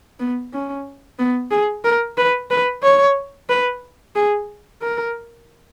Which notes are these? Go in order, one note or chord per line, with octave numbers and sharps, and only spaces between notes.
B3
C#4
B3
G#4
A#4
B4
B4
C#5
B4
G#4
A#4